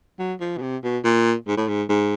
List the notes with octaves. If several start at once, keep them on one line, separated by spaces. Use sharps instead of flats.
F#3
F3
B2
C3
B2
A#2
G#2
A2
G#2
G#2